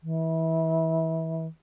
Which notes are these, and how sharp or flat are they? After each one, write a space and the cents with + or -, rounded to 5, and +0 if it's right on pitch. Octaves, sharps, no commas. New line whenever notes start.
E3 -30